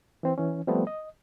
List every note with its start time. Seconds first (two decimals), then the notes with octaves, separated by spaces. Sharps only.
0.23 E3 C4
0.38 E3 C#4
0.67 F3 G3 A3 B3 C4
0.87 D#5